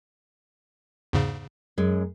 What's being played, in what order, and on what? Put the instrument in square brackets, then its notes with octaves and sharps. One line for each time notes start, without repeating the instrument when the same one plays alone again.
[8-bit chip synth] E2 G#2 C#3
[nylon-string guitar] F#2 G#3